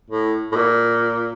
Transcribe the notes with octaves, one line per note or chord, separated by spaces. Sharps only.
A2
A2
A#2